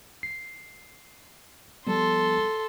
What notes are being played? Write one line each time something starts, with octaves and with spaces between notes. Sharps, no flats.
C7
F3 G3 B3 A4 C6